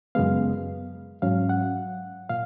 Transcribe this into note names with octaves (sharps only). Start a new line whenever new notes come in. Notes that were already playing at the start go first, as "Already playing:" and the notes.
F#2 C#3 G#3 B3 F5
G#2 F#3 C#4 F5
F#5
A#2 F5